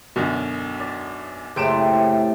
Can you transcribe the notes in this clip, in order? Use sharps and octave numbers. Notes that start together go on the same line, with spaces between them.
B1 F#2 D3
D5
F#1 A2 C3 C4 D7 E7